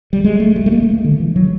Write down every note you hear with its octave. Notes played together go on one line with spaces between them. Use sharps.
G3
G#3
A3
G3
A3
A#3
A3
G#3
D3
E3
F#3